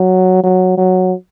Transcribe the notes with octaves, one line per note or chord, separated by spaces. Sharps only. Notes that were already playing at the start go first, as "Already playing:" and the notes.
Already playing: F#3
F#3
F#3